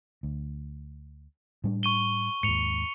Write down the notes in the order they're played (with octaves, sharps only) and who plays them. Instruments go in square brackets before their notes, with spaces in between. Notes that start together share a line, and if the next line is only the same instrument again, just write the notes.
[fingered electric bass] D2
A2 G3 D4
[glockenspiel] C#6 D#7 G7
[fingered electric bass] D#2 G#2 [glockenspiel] C#7 F7